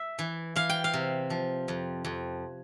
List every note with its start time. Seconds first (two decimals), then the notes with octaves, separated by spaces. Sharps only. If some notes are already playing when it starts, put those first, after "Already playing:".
Already playing: E5
0.19 E3
0.56 E3 F5
0.70 G5
0.84 F5
0.93 C3
1.30 F3
1.68 F2
2.05 F2